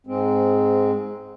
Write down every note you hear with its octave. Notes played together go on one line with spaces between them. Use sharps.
G#2 G#3 C4